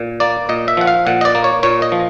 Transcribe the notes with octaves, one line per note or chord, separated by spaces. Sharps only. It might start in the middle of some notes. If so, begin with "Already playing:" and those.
Already playing: A#2
A#3 D5
A#2 D#5
E5
F3 F#5
F5
A#2 F#5
D#5
D5
A#3
C#5
A#2 C#5
D#5
F3